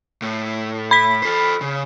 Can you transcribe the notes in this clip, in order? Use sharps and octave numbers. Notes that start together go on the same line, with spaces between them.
A2
B5 B6
A4 C5
C#3